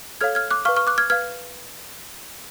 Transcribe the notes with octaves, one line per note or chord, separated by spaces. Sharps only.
A4 C#5 F5 F6 G#6
F6 G#6
D6 F#6
B4 F5 C#6 F6
C#6 F6
D6 F#6
F6 G#6
B4 F5 F6 G#6